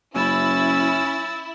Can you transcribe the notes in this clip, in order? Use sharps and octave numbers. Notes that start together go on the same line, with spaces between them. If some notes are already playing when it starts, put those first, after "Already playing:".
F#1 C#4 E4 E6 A6